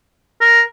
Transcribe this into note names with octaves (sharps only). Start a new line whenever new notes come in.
A#4